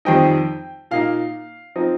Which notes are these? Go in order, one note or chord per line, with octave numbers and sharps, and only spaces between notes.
F2 D#3 G3 C4 D#4 G5
A#2 A#3 D#4 F5
F3 C4 D#4